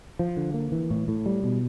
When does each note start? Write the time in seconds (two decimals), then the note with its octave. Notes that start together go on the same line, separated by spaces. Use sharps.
0.19 F3
0.37 D3
0.54 A#3
0.72 E3
0.90 A2
1.08 A2
1.26 G3
1.44 B2